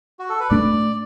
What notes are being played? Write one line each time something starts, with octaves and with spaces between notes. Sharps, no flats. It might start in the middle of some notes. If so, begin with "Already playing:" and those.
F#4
A4
B4
A2 A3 D4 D5